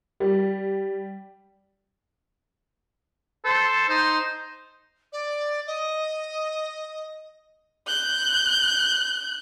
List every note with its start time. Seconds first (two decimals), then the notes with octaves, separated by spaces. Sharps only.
0.20 G3
3.45 A4 C5
3.89 D#4 C5
5.12 D5
5.67 D#5
7.87 F#6 G6